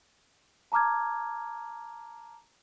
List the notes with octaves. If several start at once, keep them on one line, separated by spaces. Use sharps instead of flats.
A5 A#5 D6 F6 G#6